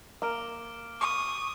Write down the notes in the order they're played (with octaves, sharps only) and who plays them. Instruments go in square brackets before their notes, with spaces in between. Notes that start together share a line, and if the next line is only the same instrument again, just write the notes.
[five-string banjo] A#3 [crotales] D6 F6 D7
[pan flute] C#6 [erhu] D#6